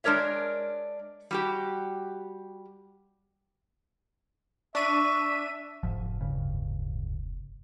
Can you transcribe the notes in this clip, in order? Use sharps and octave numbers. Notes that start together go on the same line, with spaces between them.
G#3 D4 A#4 C#5 E5
G3 F#4 G4
D4 E5 C#6 D#7
F1 G#2 F3
D1 G2 C#3